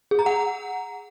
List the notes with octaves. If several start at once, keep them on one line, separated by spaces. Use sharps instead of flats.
G#4
A#5
F#5